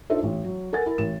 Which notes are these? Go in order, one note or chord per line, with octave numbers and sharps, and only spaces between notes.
D4 D#4 F4 A4 C5 E5
A1
F#3
A4 A#4 F#5 G#5 A6
E4 A#4
A1 E7